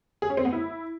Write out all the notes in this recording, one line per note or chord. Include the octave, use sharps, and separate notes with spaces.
G#4
C#4
C4
B3
E4